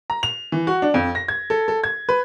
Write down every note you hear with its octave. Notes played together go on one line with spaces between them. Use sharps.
A#5
F7
E3
F#4
D4
F2
A#6
G#6
A4
A4
G#6
B4